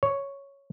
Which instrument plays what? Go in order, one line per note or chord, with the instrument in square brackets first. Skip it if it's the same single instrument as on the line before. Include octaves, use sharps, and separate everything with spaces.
[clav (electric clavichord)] C#5